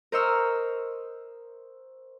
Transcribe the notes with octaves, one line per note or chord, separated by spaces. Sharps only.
A#4 C5 D#5 C#6 E6 F6